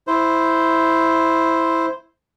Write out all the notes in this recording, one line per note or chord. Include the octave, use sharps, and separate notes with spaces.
E4 C5